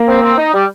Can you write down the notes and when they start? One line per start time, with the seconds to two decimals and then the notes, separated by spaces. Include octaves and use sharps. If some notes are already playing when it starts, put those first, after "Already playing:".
Already playing: A#3
0.08 C4
0.22 C4
0.38 D#4
0.54 G3